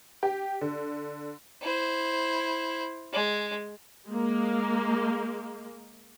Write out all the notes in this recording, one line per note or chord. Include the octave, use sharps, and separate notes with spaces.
G4
D3
E4 C5
G#3
G#3 A#3